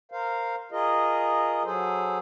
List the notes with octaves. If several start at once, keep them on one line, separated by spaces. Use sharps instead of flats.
A#4 C5 F5
F4 G#4 A#4 D#5
F#3 G#4 A4 C5